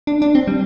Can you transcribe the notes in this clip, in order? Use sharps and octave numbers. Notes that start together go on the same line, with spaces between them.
D4
D4
C4
G3